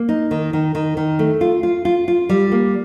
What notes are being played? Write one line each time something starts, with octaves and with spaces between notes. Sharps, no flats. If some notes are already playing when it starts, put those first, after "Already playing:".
Already playing: A#3
D#4
D#3
D#3
D#3
D#3
A3
F4
F4
F4
F4
G3
A#3